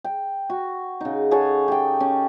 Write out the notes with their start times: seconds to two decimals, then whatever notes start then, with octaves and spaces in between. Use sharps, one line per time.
0.04 G5
0.50 F#4
1.01 C#3 D#4
1.31 G#4 A4 C#5 F#5
1.68 G4 G5
2.00 C#4